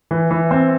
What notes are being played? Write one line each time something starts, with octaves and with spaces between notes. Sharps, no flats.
E3
E3
C4